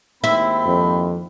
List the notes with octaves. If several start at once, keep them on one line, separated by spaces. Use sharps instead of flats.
D#2 G#2 C4 E4 B5
F2